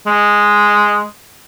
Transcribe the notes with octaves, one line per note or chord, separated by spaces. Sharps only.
G#3